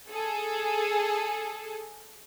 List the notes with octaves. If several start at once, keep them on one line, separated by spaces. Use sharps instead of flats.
G#4 A4